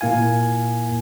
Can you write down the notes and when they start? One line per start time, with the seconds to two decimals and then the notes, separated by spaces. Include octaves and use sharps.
0.01 A#2 A#3 E4 F5 G#5